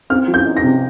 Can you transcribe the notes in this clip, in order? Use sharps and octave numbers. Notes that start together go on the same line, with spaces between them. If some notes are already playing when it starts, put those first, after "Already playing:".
C4 F6
F3
G6
D#4
A#6
C3